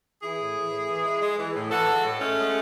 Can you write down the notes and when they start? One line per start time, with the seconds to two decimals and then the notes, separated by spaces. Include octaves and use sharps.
0.22 E3 E4 G#4
0.39 A2
0.56 E3
0.72 A2
0.88 E3
1.05 G#3
1.22 G#3
1.38 E3
1.54 A2
1.71 E3 F#4 A4
1.88 G#3
2.04 A2
2.21 G#3 A3 C#4
2.38 G#3